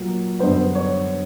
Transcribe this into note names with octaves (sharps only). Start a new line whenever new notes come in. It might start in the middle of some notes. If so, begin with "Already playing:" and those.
Already playing: A#2 F#3 A#3
F#2 D3 G3 B3 C5
C#5